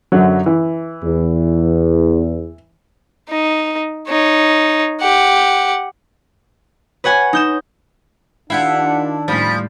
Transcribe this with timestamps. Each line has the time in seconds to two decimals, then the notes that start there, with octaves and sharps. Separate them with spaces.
0.12 F#2 D3 F#3
0.46 E3
1.03 E2
3.29 D#4
4.08 D#4 C#5
5.01 G4 F#5
7.04 B4 C#5 F#5 G#5
7.33 D#4 G6 E7
8.50 D#3 D4 E4 F4 G4 F5 F#5
9.28 D#2 A2 F3 G3 C#4 B5